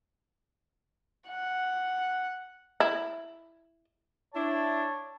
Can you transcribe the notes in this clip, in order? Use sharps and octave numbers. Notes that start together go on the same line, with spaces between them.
F#5
E4
D4 E4 C#5 A5